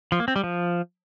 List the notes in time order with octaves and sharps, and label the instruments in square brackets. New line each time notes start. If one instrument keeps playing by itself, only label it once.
[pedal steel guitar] F3
A#3
C4
G3
F3